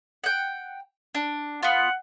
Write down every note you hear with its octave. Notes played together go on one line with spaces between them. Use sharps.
F#5 G5
D4
B3 F4 F#5